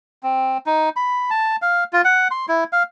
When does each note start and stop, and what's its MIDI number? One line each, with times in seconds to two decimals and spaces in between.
0.23 0.58 60
0.66 0.89 63
0.96 1.30 83
1.30 1.56 81
1.62 1.84 77
1.93 2.02 65
2.05 2.28 78
2.31 2.46 84
2.49 2.64 64
2.72 2.83 77